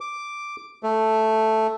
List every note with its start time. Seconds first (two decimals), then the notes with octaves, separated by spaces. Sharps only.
0.01 D6
0.83 A3